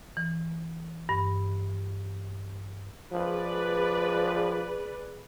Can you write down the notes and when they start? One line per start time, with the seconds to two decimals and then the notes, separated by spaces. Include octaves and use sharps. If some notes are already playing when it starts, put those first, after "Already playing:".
0.17 E3
1.09 G2
3.12 F3 G#4 B4 D5